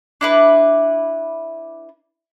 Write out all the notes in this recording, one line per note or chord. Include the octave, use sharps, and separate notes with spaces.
D4 E4 B4